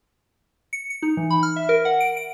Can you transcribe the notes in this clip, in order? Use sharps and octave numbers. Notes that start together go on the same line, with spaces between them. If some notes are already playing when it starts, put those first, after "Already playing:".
C#7
C#7
D#4
E3
B5
F6
E5
A#4
F#5
D7
D7